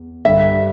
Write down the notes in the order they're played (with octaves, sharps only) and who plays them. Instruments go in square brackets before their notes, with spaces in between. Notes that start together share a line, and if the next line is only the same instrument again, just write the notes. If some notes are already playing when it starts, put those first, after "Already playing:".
Already playing: [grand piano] E2
[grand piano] G2 D3 G3 [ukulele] E5